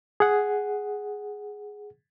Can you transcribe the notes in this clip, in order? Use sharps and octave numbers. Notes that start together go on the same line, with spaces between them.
G#4 F#5